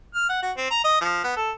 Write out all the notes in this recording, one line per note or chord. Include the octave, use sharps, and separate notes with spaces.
F6
F#5
F#4
C4
A#5
D#5
F3
B3
A4